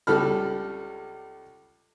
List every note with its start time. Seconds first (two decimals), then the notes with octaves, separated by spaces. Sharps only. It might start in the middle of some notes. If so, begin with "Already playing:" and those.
0.07 C#2 G3 A4 B5 F6